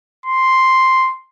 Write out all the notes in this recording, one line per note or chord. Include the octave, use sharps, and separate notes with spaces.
C6